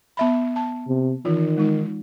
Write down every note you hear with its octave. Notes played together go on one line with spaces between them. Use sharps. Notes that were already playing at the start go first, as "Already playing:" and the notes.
B3 E5 B5
A5
C3
D#3 E3 F4
G#3 D#4